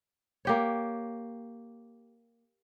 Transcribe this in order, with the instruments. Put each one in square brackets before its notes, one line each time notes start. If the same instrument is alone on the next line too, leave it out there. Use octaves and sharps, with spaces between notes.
[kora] A#3 G4 C#5